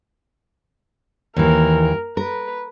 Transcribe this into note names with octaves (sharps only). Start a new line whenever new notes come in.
D#2 E3 A#4
A#4 B4